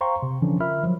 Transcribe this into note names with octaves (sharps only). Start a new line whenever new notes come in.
C5 F5 G5 A#5 C6 C#6
C3
D3 E3 F3 C#4 D4
F4 A#4 E5 B5 F6
F3 F#3